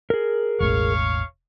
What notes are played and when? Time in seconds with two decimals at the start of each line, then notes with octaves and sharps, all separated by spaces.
0.10 G#4 A#4
0.60 E1 A1 C#5 F5 C#6